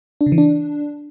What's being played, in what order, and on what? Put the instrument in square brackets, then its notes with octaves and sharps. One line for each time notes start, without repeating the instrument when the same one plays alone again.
[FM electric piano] D4
C#3
E3
D4